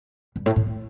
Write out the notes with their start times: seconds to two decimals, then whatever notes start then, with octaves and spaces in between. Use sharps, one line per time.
0.36 G2
0.46 A2
0.56 A2
0.66 A2